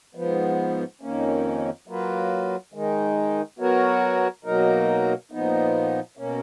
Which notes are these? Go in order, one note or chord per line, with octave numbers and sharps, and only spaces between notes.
G#2 F3 B3
F2 D#3 A#3 C#4
F#3 A#3 F4 B4
D#3 G#3 D#4
F#3 B3 F#4 A#4 C#5
B2 F#3 A#3 D#4 A#4
A#2 F3 B3 D#4
B2 A#3 C#4